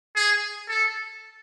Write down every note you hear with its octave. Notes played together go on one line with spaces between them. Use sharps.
G#4
A4